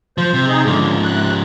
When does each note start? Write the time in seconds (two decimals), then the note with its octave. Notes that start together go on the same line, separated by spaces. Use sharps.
0.18 F3 C5
0.34 C3
0.48 D#4 G#4
0.65 G#2 D3 F3 G#3 A#3
1.04 C3 F#6